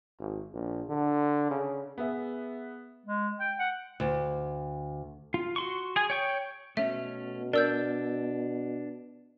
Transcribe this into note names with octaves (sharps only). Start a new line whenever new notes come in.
G#1
A#1
D3
C#3
B3 G#4 E5
G#3
G5
F#5
D2
F4
F#4 C6 C#6
G#4 G#5
C#5 G5 C#6
B2 A3 C#4 E5
D4 A#4 D5 E6 G6